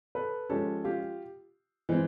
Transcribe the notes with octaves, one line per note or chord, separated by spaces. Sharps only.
A4 B4
F3 G#3 C#4 G4 A4
F4 G4
E3 G#3 C4